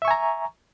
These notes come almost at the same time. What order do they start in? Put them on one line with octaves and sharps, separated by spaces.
E5 C#6 G#5 A#5